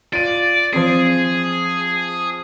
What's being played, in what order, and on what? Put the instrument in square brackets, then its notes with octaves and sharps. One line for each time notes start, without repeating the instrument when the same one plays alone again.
[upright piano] F4 D#7 [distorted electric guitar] D5
[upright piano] F3 C4 [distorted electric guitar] G#4